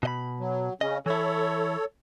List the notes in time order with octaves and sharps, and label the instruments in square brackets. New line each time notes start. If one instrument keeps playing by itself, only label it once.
[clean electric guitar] B2 D#5 B5
[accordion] F#3
[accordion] C#3 C#4 [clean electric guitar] D#5
[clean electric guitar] E3 E4 [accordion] A4 C#5